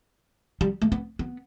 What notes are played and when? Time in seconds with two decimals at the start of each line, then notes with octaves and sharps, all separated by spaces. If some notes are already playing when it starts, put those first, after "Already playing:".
0.61 G3
0.82 A3
0.92 B3
1.19 B3